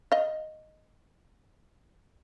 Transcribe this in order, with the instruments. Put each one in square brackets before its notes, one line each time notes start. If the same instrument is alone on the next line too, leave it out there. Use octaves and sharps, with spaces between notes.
[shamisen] D#5 F5